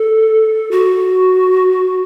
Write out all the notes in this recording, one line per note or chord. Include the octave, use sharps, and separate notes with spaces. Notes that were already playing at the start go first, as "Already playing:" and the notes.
Already playing: A4
F#4